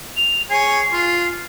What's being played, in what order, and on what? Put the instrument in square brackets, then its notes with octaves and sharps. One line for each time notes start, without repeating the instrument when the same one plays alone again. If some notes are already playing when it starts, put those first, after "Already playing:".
[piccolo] F7
[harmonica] G#4 C#5 G#5 [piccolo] C7
[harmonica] F4